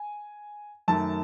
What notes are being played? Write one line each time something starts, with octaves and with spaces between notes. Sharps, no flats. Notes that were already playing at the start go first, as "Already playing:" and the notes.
Already playing: G#5
F#2 D#3 A3 A5